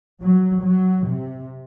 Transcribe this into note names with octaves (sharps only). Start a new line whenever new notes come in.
F#3
F#3
C3